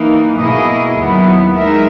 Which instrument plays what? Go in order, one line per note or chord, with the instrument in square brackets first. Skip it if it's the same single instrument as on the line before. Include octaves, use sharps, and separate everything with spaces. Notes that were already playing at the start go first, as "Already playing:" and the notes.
Already playing: [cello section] E3 A#3 D#4
B2 A#3 E4 G#4 D#5
D#2 D#3 F#3 B3 E4
G#3 D#4 A#4 E5